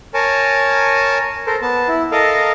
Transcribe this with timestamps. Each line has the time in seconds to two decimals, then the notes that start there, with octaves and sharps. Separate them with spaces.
0.14 A#4 C#5 G#5 A5
1.47 A4 A#4 C5
1.62 B3 A5
1.88 E4
2.12 A4 A#4 D#5 F5